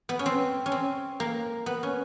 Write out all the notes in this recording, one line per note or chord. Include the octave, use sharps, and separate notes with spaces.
B3
C#4
C4
C#4
C4
A#3
B3
C#4